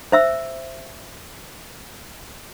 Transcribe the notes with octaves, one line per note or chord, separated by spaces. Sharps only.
C5 E5 E6